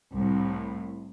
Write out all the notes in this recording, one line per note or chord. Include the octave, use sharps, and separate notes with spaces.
C2 A2